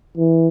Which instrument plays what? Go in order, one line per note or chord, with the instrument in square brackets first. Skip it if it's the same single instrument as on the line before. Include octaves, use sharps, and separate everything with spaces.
[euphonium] E3